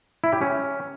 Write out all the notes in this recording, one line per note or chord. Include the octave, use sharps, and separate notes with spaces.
E4
G4
C#4